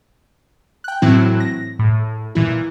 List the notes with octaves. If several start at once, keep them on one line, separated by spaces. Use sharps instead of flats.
G5 F#6
A2 E3 F#3 C4 E4 F#6
A#6
A2
A#2 E3 E4